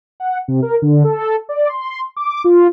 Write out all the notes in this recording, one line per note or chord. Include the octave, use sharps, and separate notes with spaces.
F#5
C3
A#4
D3
A4
D5
C6
D6
F4